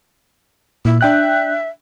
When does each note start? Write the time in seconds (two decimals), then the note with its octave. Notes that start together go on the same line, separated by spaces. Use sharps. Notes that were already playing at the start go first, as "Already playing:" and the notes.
0.85 A#2 E4
1.01 D4 E5 G5 F#6